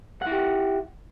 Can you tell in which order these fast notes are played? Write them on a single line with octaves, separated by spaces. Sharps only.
F#5 E4 G4